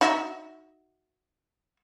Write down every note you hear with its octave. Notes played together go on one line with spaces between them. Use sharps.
D#4 F#4 E5